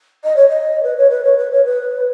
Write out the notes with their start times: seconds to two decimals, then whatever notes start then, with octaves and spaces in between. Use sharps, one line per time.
0.24 D#5
0.36 C#5
0.49 D#5
0.83 B4
0.97 C#5
1.10 B4
1.24 C#5
1.38 B4
1.51 C#5
1.65 B4